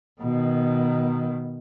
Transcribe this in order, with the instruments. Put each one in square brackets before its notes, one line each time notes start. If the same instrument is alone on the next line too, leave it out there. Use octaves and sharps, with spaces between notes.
[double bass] B2 D#3